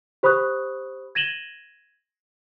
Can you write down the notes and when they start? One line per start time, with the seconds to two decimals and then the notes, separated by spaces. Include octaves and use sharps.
0.23 G4 C5 B5 C#6 D#6 F#6
1.15 G#6 A#6 D#7 E7 F#7 G7